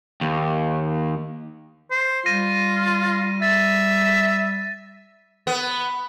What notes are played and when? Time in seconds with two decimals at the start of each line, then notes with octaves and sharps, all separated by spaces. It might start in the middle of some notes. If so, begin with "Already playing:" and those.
0.21 D#2
1.91 C5
2.26 G3 F4 A#6 D#7
3.42 E5 A6
5.47 B3